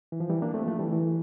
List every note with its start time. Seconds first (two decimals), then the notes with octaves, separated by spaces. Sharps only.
0.12 E3
0.20 F3
0.29 E3 G3
0.42 A#3 D4
0.54 A3 C4
0.67 F3 A3
0.79 E3 G3
0.92 E3